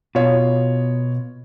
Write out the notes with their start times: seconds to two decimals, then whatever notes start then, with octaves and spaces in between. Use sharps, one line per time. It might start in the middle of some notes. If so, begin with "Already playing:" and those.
0.15 B2 F4 C#5